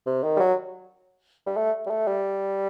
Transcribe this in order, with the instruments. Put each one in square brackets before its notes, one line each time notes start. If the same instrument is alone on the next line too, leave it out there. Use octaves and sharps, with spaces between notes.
[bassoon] C3
D#3
G3
F#3
G3
A3
G3
A3
G3